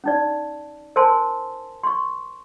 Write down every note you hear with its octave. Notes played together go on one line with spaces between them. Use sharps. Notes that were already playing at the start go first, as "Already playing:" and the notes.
C#4 D#4 D5
A#4 C5 G#5 A5 C6
C6 C#6